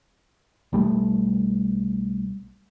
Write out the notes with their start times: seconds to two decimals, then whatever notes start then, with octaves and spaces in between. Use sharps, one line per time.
0.73 B1 G3 A3